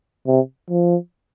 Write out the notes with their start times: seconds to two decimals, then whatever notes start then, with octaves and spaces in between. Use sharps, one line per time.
0.27 C3
0.70 F3